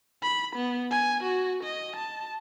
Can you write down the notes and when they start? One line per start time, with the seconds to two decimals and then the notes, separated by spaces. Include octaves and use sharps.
0.23 B5
0.56 B3
0.91 G#5
1.24 F#4
1.64 D#5
1.97 A5